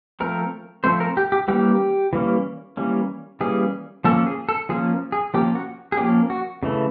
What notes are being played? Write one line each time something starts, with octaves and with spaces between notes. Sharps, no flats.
F3 A3 C4 A#4
F3 A3 C4 C5
A#4
G4
G4
E3 G3 A#3 C#4 G4
E3 G3 A#3 C#4
E3 G3 A#3 C#4
E3 G3 A#3 C#4 G#4
F3 A#3 C#4 A4
G#4
A4
F3 A#3 C#4 G#4
G#4
F3 A#3 C#4 G4
F#4
G#4
F3 A#3 C#4 G4
F#4
C#3 E3 A3